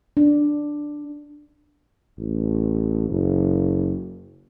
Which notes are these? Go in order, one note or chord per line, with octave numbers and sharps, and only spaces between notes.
D4
A1
F#1